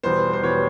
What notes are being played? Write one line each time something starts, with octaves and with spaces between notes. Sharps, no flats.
E2 B2 G3 C5
C5
E2 B2 G3 C#5